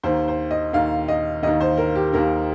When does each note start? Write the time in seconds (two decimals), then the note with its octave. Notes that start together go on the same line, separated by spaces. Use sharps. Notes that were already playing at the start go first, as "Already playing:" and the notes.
0.03 D#2 D#3 C5
0.28 C5
0.51 D#5
0.73 D#2 D#3 F5
1.08 D#5
1.43 D#2 D#3 D#5
1.61 C5
1.78 A#4
1.95 G4
2.12 D#2 D#3 A#4